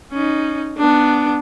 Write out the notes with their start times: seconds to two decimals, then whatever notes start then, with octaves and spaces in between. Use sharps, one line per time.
0.12 C#4 D#4
0.77 B3 D4